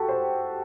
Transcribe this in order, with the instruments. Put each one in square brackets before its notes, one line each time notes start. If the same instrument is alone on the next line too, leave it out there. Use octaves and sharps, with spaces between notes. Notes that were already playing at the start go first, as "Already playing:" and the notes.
Already playing: [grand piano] F#4 G4 A4
C5